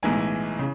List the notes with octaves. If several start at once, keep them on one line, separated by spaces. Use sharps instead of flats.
B1 A2 E3 G#3 G#5
C#3